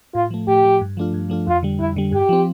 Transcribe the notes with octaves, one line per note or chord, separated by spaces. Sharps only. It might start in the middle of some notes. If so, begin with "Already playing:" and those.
A2 F4
F3 A3
A2 G4
F3 A3
G2
F3 A3 D4 F4
G2
F3 A3 D4 F4
F2 F4
D3 G3
F2 E4
D3 G3
G2 G4
F3 C4